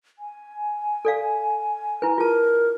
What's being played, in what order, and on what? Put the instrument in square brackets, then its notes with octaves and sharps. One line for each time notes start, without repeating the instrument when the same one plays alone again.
[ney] G#5
[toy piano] A4 D5 F5
E4 B4
[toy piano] F4 G#4 A5 [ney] A#4